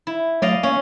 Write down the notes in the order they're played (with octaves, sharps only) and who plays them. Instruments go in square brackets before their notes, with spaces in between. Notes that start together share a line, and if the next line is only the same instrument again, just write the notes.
[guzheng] E4
[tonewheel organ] F#3 A3 [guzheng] D5 D#5 F5
[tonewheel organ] A#3 [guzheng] C#4